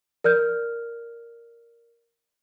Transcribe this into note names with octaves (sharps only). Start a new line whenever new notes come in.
A#4 D5 F6 G6